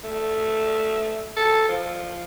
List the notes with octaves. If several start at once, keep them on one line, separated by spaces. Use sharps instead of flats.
A3
A4
F3